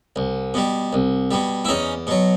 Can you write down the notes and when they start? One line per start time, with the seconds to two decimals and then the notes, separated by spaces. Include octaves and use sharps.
0.16 C2
0.54 B2 G3
0.93 C2
1.31 B2 G3
1.65 E4
1.68 E2 C#4 D#4
2.07 B2 F#3